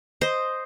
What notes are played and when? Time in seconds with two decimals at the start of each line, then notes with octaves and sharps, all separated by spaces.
0.21 C5 D#5